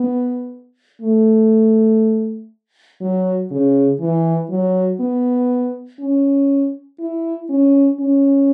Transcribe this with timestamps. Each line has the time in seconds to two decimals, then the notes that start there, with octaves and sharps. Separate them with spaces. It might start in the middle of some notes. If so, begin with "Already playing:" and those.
Already playing: B3
1.02 A3
3.01 F#3
3.51 C#3
4.00 E3
4.50 F#3
5.00 B3
6.00 C#4
6.99 E4
7.49 C#4
8.00 C#4